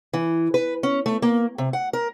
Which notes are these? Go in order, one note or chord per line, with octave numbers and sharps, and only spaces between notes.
E3
B4
C#4
A3
A#3
C3
F#5
A#4